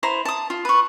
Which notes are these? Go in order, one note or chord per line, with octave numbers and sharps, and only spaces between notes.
E4 C5 A#5
A5 D#6
F4
B4 C#6